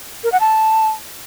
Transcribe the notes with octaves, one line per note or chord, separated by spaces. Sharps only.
A#4
F#5
A5